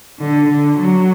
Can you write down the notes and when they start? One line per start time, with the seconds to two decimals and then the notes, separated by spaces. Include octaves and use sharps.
0.20 D3
0.49 D3
0.79 F#3